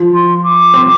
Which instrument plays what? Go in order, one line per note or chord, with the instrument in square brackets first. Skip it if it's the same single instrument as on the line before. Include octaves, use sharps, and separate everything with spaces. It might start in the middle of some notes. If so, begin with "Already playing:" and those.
Already playing: [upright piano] F3
[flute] C6
D6
[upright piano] C4